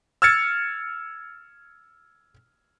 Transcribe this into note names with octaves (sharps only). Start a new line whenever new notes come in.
E6 F6 G#6 A6 C#7